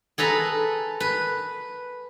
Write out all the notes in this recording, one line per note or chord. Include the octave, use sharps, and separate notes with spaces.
G#4 A4 B4 A#5
B4